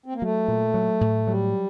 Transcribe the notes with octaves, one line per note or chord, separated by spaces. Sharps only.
C4
A#3
F#3 A3
A#2
F#3
A2
F#3 G3